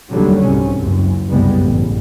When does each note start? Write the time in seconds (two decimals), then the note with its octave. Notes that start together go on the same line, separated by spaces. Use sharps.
0.12 F1 D#2 D3 F#3 G3
0.43 C2 G#2 C3 C#4
0.76 F#1 C#2 F#2
1.28 F#1 C2 G2 G3 G#3 B3
1.62 A1